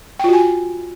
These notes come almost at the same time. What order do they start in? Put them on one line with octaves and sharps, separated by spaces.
G5 F4 F#4 G#5